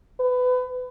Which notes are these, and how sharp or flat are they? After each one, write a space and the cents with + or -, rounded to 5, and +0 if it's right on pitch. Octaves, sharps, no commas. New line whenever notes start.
B4 +25